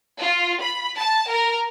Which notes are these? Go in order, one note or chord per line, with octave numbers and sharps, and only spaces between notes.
F4
B5
A5
A#4